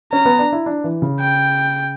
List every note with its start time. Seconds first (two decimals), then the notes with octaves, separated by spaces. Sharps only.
0.13 C#4 A#5
0.25 B3
0.39 D4
0.53 E4
0.66 D4
0.84 E3
1.02 C#3
1.20 G5